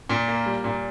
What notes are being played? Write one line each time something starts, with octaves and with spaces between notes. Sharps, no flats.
A#2
A#3
G3
A#2